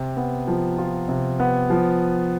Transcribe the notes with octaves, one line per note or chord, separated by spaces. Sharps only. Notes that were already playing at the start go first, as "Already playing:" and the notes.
Already playing: C3
B3
F3
F4
C3
B3
F3